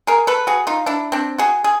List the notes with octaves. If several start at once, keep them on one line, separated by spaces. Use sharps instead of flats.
G#4 A#4
A4 B4
F#4 G#4
D#4 F4
D4 E4
C4 D4
F#4 G#4
G#4